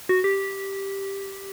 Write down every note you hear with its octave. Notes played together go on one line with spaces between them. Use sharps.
F#4
G4